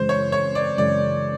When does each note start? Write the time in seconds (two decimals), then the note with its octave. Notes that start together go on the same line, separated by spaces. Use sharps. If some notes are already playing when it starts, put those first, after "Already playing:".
Already playing: F#2 C#3 E3 G#3 C5
0.09 C#5
0.32 C#5
0.55 D5
0.78 F#2 C#3 E3 G#3 D5